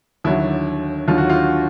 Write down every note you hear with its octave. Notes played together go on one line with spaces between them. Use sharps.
D#2 D3 F#3 E4
D#2 D3 F#3 F4
F#4
F4